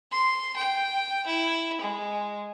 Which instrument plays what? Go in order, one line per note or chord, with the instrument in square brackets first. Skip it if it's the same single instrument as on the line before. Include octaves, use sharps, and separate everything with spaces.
[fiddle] C6
G5
E4
G#3